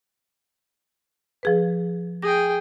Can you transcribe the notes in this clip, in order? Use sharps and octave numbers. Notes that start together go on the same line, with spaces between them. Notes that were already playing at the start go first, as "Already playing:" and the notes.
F3 G#4 B4
G#4 G5 A#6